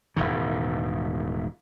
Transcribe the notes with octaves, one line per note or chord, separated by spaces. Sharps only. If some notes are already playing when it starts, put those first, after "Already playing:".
E1 C2 A2 D#3